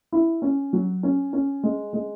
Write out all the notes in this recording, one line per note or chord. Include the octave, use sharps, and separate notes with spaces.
E4
C#4
F#3
C#4
C#4
G#3
G#3